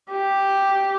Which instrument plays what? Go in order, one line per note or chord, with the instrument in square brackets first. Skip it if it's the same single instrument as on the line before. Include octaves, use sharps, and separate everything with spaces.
[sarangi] G4